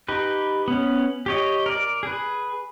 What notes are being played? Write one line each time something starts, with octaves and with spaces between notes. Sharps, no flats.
D#4 G4 B4
B3 C#4
G4 C#5 D#5
A#4 D5
G#4 B4